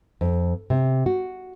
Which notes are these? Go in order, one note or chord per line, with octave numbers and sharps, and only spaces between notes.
F2
C3
F#4